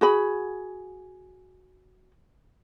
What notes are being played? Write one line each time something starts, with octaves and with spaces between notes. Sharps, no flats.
F#4 G#4 B5